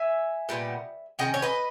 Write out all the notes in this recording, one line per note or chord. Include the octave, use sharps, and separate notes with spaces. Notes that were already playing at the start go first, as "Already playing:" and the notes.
Already playing: E5 G#5
A#2 G3 B3
D#3 G3 C#4 D#5 G5
C#5
B4 D#5